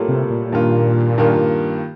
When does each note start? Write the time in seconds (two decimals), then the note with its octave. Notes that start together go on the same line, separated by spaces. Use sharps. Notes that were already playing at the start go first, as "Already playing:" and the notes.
Already playing: A2 G3 A#3 F4 A4
0.08 C3
0.30 A#2
0.52 G2 D#3 A#3 F4
1.18 G2 D#3 A#3 F4